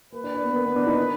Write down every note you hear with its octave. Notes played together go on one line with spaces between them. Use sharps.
A#3 B4
D4
D4
B3
A#3
B3
D4
D#4
D4